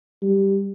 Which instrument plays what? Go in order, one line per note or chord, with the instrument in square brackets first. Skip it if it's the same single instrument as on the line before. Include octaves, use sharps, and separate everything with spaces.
[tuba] G3